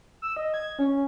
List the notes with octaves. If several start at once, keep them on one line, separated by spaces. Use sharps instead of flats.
E6
D#5
G#6
C#4